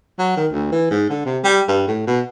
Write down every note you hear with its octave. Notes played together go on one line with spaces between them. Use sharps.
F#3
D#3
D2
E3
G#2
D3
C3
G3
G2
A2
B2